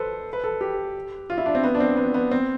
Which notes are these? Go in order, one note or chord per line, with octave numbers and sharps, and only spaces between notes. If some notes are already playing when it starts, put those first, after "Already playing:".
Already playing: A4 B4 C5
B4
A4
G4
F4
E4
D4
C4
B3
D4
C4
B3
B3
C4